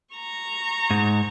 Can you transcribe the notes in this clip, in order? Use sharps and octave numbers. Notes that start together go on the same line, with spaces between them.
A#5 C#6
G#2